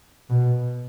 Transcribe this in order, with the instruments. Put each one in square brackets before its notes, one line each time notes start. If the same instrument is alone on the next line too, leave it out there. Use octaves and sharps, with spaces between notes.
[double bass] B2